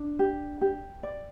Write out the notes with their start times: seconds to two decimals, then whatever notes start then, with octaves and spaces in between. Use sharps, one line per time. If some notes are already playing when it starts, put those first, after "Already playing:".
Already playing: D4
0.19 G4
0.61 G4
1.03 D5